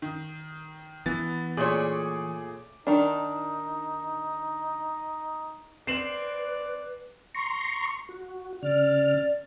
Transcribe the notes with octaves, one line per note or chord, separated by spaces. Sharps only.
D#3
E3 B3 A6
A#2 A3 G#4 C#5 D6
D#3 D4 D#4
C4 B4 D5 C7 E7 F#7
A#5 C6 C#6
F#4
C#3 D5 F6